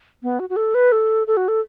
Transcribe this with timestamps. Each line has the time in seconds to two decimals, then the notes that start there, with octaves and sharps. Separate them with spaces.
0.23 B3
0.40 F#4
0.50 F#4
0.56 A4
0.75 B4
0.92 A4
1.27 A4
1.37 F#4
1.48 A4